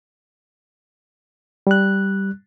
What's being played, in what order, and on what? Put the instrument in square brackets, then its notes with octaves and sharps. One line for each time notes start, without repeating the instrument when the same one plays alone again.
[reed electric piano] G3 F#6